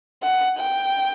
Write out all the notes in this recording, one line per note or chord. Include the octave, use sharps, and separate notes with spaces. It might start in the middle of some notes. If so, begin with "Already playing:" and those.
F#5
G5